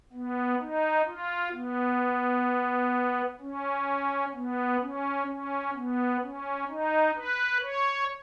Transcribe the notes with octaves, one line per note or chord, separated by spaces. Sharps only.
B3
D#4
F4
B3
C#4
B3
C#4
C#4
B3
C#4
D#4
B4
C#5